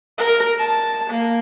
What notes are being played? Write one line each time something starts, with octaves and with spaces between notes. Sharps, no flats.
A#4
A5
A#3